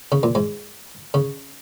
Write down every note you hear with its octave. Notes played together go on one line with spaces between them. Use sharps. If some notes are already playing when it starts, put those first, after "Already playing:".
C#3
A#2
G#2
C#3